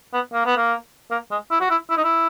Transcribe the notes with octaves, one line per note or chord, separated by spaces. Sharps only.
B3
A#3
B3
A#3
A#3
G#3
E4
F#4
E4
E4
D#4
E4